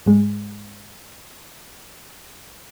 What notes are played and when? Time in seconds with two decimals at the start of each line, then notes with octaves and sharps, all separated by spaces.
0.06 G#2 G#3